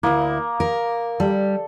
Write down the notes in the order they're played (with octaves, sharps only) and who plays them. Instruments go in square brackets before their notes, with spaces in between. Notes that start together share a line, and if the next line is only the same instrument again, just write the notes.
[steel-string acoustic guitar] D2 E4 [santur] A#3 D#6
[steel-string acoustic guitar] A#4
[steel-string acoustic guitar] G3 [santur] A4